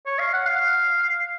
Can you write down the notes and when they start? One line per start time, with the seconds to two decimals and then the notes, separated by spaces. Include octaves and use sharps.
0.06 C#5
0.19 F5
0.33 F#5
0.46 F5